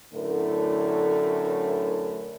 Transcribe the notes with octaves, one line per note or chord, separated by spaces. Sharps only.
F#2 A2 D3 A3 E4 A#4